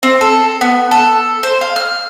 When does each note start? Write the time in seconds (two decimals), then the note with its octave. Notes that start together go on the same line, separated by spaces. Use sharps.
0.03 C4
0.21 A4
0.61 B3
0.91 A4
1.43 C5
1.61 F5
1.76 F6